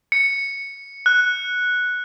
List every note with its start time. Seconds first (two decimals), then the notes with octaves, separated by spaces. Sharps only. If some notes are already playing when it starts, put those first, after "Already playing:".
0.12 C#7
1.06 F#6